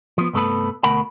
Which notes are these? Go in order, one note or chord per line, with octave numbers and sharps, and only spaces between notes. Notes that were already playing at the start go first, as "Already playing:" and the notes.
F3 B3
C2 G2 A3 B3 A4 B4
D2 B2 A3 A#4 F#5 B5